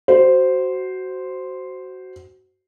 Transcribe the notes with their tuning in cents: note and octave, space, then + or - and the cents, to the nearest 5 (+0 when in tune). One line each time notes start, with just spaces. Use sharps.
F#4 +15 C5 -5